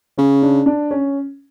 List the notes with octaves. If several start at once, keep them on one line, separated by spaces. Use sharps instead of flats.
C#3 C#4
D4
D4
C#4